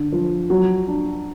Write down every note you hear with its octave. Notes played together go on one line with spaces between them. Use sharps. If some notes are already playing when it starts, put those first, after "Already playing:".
Already playing: D3
F3
F#3
D4